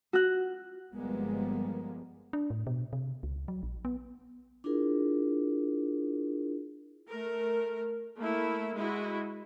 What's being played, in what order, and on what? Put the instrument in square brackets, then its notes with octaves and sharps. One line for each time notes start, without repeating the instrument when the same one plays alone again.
[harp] F#4 F#6
[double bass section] G1 F3 G3 G#3 A#3 B3
[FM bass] D4
A2
B2
C3
C#2
F#3
A#1
B3
[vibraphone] D4 E4 F4 G#4 A#4
[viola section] A3 A#4
A3 A#3 E4
G#3 E4 F#4